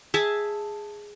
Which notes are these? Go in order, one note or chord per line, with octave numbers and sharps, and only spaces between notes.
G#4 E5 A5